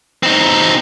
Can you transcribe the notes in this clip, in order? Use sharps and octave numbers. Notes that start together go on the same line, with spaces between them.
C4 D#4